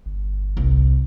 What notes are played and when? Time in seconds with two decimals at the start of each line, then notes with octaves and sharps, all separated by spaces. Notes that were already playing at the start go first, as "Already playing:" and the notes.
0.06 G1
0.57 C2